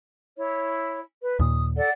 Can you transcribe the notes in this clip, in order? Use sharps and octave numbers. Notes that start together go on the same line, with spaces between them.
E4 C#5
B4
D#2 A#2 D#6
A4 D5 F#5